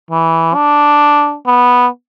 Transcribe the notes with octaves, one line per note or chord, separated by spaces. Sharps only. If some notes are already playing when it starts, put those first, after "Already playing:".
E3
D4
B3